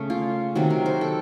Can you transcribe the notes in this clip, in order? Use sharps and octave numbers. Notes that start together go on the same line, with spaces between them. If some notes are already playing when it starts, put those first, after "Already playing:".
Already playing: C#3 A3
F4
C3 D#3 F#3 F#4
A#4
C5
A4